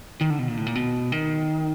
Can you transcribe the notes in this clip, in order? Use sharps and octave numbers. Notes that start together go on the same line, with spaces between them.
D#3
D3
B2
A#2
A2
A#2
B2
D#3